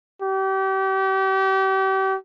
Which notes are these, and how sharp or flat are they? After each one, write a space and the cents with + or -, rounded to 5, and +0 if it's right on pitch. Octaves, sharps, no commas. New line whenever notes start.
G4 -35